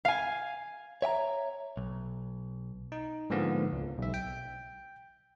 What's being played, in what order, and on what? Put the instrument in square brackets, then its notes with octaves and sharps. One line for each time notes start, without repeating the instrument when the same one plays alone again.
[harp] F5 G#5
[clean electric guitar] C#5 E5 G5 A#5
B1
[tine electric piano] D#4
G#2 D3 F3 A#3 B3
C#2
B1 E5
G5